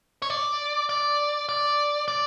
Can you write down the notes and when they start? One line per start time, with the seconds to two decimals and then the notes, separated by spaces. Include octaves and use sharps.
0.22 C#5
0.30 D5
0.89 D5
1.49 D5
2.08 D5